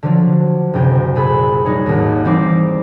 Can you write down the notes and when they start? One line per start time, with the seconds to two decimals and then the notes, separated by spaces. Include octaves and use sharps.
0.03 D3 F3 F#3
0.73 F#1 D2 C3 G5 G#5
1.15 A#2 G#4 A4 G#5 B5 F#6
1.65 G3 G#3 D#4 G#4 C#5
1.86 G#1 D#2
2.25 E3 G3 C4 D#4 D6 C7